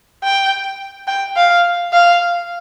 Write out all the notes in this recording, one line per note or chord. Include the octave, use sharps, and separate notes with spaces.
G5
G5
F5
F5